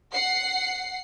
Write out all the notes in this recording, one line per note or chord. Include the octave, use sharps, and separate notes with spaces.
F#5 C7